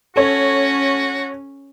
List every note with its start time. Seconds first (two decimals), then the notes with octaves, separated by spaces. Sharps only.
0.16 C#4 F#4 A4 C#5